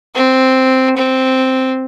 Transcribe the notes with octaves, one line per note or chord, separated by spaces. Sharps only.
C4
C4